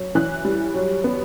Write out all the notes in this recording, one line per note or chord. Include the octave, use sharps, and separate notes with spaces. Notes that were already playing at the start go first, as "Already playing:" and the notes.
Already playing: F#3
E3 F#6
G3
F#3
B3